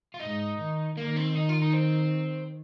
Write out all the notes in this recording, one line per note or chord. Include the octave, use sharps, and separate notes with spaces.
F4
G#2 D#4
D#3
D#3 A#3
C4
D#4
F4
D#4
C4